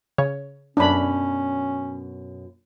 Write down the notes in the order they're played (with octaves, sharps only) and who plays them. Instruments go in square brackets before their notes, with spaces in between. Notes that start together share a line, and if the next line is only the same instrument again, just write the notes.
[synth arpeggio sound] C#3 C#5
[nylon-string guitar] F#2 B2 [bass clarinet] C#4 [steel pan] D4 B5